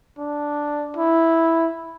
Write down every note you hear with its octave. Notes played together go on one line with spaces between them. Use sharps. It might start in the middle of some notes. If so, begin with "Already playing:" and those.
D4
E4